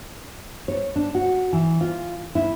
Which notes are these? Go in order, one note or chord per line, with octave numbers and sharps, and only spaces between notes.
C#5
D4
F#4
E3
F4
E4